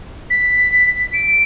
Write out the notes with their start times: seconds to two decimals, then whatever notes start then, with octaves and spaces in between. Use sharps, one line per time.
0.30 B6
1.13 D7